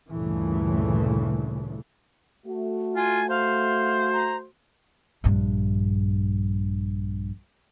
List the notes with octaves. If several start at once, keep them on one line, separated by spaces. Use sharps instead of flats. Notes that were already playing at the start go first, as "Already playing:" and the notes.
D2 G2 A#2 C#3 E3 A3
A3 F#4
F4 G#5
C5 F5
A#5
A#1 G2